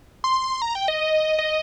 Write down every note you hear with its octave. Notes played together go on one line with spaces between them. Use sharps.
C6
A#5
G5
D#5
D#5